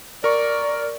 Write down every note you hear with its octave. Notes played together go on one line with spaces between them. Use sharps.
A#4 D5 C#6